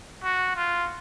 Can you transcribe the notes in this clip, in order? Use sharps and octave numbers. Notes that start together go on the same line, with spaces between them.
F#4
F4